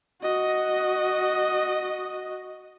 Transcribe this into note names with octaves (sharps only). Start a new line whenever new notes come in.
F#4 D#5